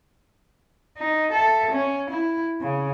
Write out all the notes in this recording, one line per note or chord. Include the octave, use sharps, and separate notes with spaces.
D#4
A4 E5
C#4
E4
C#3